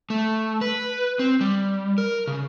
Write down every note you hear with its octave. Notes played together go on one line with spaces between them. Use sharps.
A3
B4
C4
G3
A#4
C#3